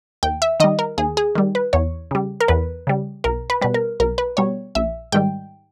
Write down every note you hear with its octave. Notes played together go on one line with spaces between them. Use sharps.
D#2 G5
E5
D#3 G3 D#5
A#4
D#2 G#4
G#4
D#3 G3
B4
E2 C#5
C#3 G3
A#4
E2 B4
C#3 G3
B1 A#4
B4
B2 G3 B4
A#4
B1 A#4
B4
B2 G3 C#5
A#1 E5
G#2 D#3 G3 G5